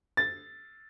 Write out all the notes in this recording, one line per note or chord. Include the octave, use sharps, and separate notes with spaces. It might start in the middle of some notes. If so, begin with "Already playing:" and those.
A6